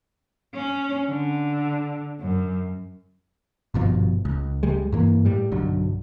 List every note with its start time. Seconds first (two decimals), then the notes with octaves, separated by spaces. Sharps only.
0.54 C#4
1.08 D3
2.20 F#2
3.74 G#1 G2 B2 F3
4.25 C#2
4.63 C#2 G3 G#3
4.92 G2 E3 A#3
5.25 A2 G3
5.52 B1 G2 D3 F#3